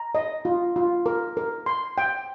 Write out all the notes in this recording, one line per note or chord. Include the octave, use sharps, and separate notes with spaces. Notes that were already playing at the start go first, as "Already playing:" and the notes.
Already playing: A#5
D#5
F4
F4
A#4
A#4
C6
G5